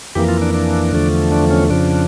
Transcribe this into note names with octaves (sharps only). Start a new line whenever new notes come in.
F2 E3 A#3 G4
F4
D4
D4
E2 D3 F3 A3
D4
C#4
F2 C#3 F3 D4